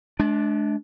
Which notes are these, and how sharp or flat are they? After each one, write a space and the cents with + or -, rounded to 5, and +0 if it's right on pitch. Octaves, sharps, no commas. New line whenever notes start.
G#3 +45 D4 +0